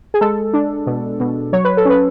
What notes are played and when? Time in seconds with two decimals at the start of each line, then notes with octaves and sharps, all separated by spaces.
0.14 G#4
0.21 G#3 A4
0.54 D4
0.87 B2
1.20 B2
1.53 F#3 C#5
1.65 B4
1.77 A4
1.85 C#4 B4